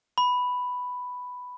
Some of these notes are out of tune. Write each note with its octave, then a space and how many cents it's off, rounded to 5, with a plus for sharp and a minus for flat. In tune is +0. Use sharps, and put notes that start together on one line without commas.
B5 +5